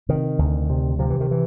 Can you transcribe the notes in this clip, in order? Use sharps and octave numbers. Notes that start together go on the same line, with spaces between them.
C3 D#3
D2
C3
C3 F3
E3
D#3
E3